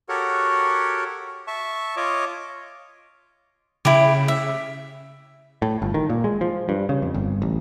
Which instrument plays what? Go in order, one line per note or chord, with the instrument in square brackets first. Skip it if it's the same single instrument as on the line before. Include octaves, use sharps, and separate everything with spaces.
[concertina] F#4 G4 A4 A#4 C#5 F#5
E5 A5 C#6
F4 C#5 D#5 D6
[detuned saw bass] C#3 [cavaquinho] E4 G4
[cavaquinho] E5
[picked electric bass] A2
G1
D#3
A#2
G#3
F3
G2
C#3
F2
G1
A1